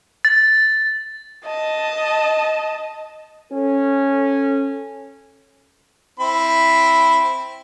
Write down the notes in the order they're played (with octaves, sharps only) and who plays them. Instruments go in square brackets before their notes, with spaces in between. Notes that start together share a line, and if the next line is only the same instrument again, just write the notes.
[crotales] A6
[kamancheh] D#5 A5
[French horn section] C#4 A4
[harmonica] C4 E4 B5